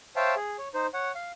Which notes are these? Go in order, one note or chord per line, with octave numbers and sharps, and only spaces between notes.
C5 C#5 E5 F5 G5 A5
G#4
C#5
D#4 C5
C#5 F#5
F5